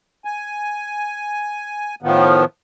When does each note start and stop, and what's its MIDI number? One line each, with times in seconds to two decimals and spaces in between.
0.25 1.95 80
2.02 2.45 45
2.02 2.45 51
2.02 2.45 53
2.02 2.45 59